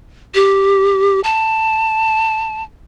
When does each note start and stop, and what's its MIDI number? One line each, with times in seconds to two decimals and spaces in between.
0.35 1.20 67
1.24 2.63 81